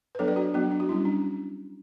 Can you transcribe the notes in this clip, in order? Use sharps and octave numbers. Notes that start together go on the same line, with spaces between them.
B4
F#3 B3 D4 A4 C#5
B4 D5
D4 F#4
F#3 B3 D4 F#4
D4
F#4
G3 C#4 E4
D4